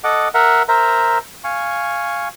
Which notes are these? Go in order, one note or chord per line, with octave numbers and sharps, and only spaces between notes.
A4 D#5 F#5 D6
A#4 E5 F#5
A#4 C5 E5 A#5
F5 G#5 C#6